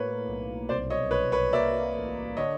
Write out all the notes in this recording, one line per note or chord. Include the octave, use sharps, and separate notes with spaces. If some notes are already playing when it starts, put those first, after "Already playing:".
Already playing: A2 A#3 B4 C#5
B1
C2 C5 D5
C#5 D#5
C2 B4 C#5
B4 C#5
A#3 D5 E5
A1
D3 C#5 D#5